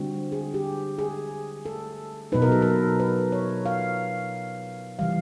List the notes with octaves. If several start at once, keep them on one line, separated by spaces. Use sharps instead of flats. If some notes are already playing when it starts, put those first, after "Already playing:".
Already playing: D3 G3 C4 F#4
G#4
G4
G#4
A4
B2 F#3 B3 D#4 B4
A#4
A4
A#4
B4
C#5
F5
C3 E3 G3 F5